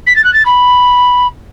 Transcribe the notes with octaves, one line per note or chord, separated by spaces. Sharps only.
B6
A6
F#6
A6
B5